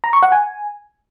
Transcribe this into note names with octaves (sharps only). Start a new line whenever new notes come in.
A#5
C#6
F#5
G#5